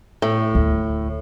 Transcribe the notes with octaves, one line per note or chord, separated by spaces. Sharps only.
A2
D2